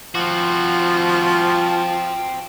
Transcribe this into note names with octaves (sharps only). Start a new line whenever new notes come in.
F3 C4 F#4